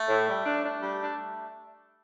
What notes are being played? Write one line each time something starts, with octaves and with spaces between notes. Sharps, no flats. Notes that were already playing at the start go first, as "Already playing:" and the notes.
Already playing: A3
A2
G3
D4
D4
G3
D4